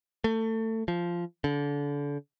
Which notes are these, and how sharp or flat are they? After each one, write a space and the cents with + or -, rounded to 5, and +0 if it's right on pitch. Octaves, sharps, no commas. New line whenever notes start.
A3 +25
F3 -10
D3 -30